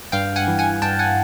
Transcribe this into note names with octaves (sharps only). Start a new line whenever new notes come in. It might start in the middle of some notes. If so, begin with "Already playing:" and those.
G2 F5 G5
F#5 G#5
E3
F#5 G#5
G2 G5 A5
F#5 G#5